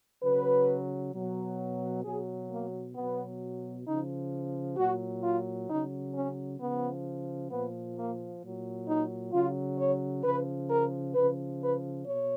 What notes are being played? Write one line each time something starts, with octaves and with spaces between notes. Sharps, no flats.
C#3 F#3 B4
B2 F#3
B2 F#3 G#4
A#3
B2 F#3 B3
C#3 F3 D#4
A#2 F#3 F#4
F4
C#3 F#3 D#4
C#4
C#3 F3 B3
A#2 F3 B3
A#3
A#2 F#3
D#4
C#3 F#3 F4
C#5
C#3 F3 B4
A#4
C#3 F3 B4
B4
B2 C#5